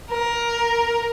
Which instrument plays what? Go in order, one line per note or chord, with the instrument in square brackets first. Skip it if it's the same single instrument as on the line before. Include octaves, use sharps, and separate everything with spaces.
[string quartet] A#4